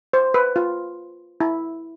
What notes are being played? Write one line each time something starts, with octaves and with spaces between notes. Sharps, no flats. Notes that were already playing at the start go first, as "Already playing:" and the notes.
C5
B4
F4
E4